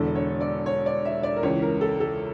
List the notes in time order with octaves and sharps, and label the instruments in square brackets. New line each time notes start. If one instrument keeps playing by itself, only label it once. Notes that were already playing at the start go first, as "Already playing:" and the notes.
Already playing: [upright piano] E1 E2 D3 A4
C#5
D5
C#5
D5
E5
D5
A#4
C#2 C#3 E3 C#5
A#4
A4
A4